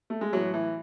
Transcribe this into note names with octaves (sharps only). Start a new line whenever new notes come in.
A3
G#3
A2 E3 F#3
E3